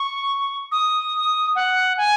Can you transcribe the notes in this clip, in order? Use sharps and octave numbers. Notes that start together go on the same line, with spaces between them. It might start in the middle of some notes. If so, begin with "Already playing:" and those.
Already playing: C#6
D#6
F#5
G#5